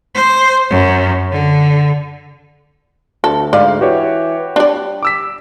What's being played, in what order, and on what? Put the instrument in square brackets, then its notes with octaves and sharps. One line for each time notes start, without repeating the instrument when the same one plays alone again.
[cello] C5
F#2
D3
[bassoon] D2 [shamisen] A4
[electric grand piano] G#2 F5 [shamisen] D5
[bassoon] E3 [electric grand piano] F#4 G4 C#5
[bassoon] G3 [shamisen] D4 D5
[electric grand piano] D6 E6 B6